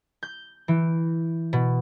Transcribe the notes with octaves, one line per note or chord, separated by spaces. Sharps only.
G6
E3
B2